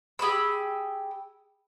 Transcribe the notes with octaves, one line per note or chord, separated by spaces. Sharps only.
G4 G#4 B5 E6